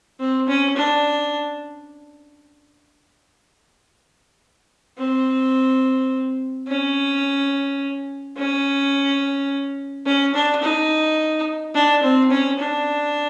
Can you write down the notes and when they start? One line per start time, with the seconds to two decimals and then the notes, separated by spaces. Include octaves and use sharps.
0.20 C4
0.48 C#4
0.77 D4
4.98 C4
6.68 C#4
8.37 C#4
10.06 C#4
10.35 D4
10.63 D#4
11.75 D4
12.03 C4
12.31 C#4
12.59 D4